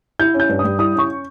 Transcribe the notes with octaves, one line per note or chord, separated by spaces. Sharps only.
E4 G6
C#4
G6
G2
G3 D#6
E4 D#6
C#4 C#6